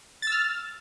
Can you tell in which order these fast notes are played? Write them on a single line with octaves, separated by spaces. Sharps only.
A6 E6 F6